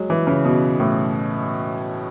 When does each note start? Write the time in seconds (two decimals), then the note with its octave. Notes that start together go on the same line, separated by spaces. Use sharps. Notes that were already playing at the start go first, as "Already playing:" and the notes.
Already playing: F#3 G#3
0.10 E3
0.27 C#3
0.45 B2
0.80 A2